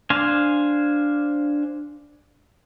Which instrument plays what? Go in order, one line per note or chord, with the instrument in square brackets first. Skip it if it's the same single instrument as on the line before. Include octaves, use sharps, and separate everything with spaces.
[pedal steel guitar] D4 C5 F5 G#5